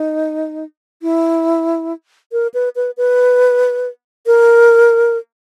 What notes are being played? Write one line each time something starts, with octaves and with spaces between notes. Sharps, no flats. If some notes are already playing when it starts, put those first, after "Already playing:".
Already playing: D#4
E4
A#4
B4
B4
B4
A#4